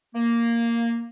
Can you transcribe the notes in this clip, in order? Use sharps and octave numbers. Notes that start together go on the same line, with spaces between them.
A#3